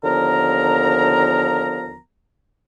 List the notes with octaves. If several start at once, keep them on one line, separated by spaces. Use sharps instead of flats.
D#2 D3 F3 B3 A#4 A#5